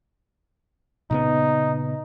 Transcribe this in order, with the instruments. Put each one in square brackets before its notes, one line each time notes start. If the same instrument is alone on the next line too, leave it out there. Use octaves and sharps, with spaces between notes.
[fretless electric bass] A#2 C#3 B3 [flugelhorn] D#4